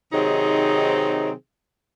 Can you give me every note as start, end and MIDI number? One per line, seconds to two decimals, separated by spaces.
0.13 1.32 48
0.13 1.32 51
0.13 1.32 54
0.13 1.32 60
0.13 1.32 63
0.13 1.32 68